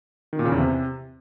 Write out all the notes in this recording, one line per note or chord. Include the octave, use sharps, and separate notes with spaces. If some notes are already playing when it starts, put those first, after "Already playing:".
D#3
A#2
C#3
E2
C3